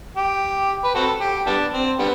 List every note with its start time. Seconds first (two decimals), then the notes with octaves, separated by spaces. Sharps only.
0.17 G4
0.84 B4
0.95 C4 F#4 A4
1.21 G4
1.47 G3 B3 D4
1.73 C4
1.99 D3 G3 B3